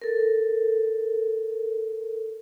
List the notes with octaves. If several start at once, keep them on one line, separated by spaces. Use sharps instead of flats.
A4 A#4